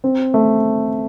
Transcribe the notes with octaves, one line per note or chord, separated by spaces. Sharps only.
C4
A3